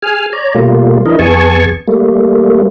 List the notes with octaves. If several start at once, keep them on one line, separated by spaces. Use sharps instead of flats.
G#4 G#5 F6
C#5 D5 A#5
B2 G3 A3 A#3 F4
E3 D4 E4 A#4 D#5
F2 B3 G#4 G#5 A5 C#6
G3 A3 A#3